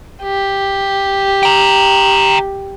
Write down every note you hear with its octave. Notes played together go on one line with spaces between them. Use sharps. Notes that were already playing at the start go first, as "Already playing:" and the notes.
G4
G5 A#5